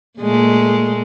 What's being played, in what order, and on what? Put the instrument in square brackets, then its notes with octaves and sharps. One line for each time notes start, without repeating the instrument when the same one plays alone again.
[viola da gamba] A#2 G#3 A3